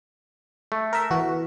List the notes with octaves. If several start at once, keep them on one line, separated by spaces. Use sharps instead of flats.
A3
A#4 E5
E3 F#4